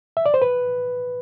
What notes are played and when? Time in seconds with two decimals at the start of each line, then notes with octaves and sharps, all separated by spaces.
0.17 E5
0.26 D5
0.34 C5
0.42 B4